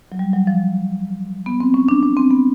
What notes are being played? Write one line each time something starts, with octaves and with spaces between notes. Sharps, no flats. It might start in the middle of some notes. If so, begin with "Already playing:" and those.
F#3
G3
F#3
F3
B3
C4
C#4
D4
D4
C4
B3